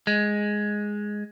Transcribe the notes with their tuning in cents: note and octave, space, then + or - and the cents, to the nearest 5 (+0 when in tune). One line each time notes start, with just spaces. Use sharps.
G#3 +0